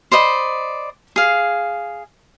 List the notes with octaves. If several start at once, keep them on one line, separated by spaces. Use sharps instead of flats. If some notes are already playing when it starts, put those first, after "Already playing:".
C5 D5 D#5 B5
G#4 F5